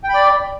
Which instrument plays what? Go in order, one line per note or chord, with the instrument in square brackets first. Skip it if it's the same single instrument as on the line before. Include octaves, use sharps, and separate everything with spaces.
[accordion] G5
B5
D5